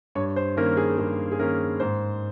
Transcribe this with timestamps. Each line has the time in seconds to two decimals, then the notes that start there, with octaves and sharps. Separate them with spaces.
0.15 G2 C#5
0.36 C5
0.57 D#3 A#3 C#4 A#4
0.77 G#4
0.98 G2 G#4
1.32 G#4
1.39 D#3 A#3 C#4 A#4
1.80 G#2 C5